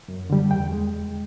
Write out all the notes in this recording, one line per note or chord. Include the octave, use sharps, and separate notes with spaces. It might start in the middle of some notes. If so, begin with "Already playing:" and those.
F#2
D3 G3
E2 G5
G#3